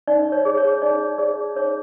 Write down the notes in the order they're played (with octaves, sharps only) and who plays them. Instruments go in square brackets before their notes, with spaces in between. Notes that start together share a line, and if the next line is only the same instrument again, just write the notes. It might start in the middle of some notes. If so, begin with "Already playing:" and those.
[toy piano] D#4 D5
C#5
G#4 C#5
C#5
D#4 D5
G#4 C#5 D5
D#4 C#5